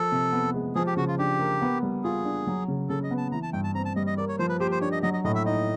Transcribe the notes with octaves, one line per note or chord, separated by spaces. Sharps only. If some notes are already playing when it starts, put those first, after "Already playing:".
Already playing: F3 A#3 A4
C3
B3
G#3
F3 G#4
G4
C#3 F#4
F4
D4 G4
A#3
B3
G3
F4 G#4
D4
F#3
C#3
C#3 A4
D#5
B3
A5
E3 A#5
A5
G2 G5
A5
C4 A#5
A5
G3 D#5
D#5
A#3 D5
C#5
F3 C5
B4
G4 C5
C5
D4 C#5
D#5
F#3 D#5
D#5
A2 D#5
E5
D#4 D#5